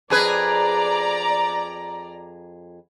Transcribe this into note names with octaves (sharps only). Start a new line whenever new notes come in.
F2 G#4 B4 D5 A#5